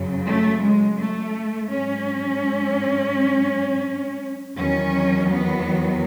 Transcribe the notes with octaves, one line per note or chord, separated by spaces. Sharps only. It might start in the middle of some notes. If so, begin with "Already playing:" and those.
Already playing: F#2 C#3 F#3
A3
G#3
A3
G#2 F#3 C#4
E2 D#3 F#3 C#4
B3